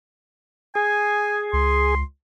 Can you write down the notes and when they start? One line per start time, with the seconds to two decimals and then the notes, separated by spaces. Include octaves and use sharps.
0.75 G#4 G#5
1.53 C#2 C6